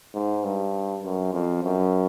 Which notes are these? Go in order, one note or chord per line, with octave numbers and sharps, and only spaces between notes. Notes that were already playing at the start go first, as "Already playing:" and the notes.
G#2
G2
F#2
F2
F#2